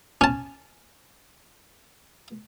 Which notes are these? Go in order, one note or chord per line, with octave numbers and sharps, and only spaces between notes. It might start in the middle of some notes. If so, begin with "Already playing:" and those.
C#4 A5